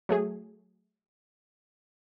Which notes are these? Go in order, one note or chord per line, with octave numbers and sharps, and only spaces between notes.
F#3 A3 G#4